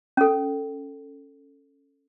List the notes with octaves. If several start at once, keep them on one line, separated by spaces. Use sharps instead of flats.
C#4 A4